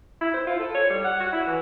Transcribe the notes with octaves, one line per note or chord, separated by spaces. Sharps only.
E4
C5
F4
A4
C#5
G3
F#5
F#4
E4
E3